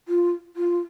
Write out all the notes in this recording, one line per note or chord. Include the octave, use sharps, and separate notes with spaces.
F4
F4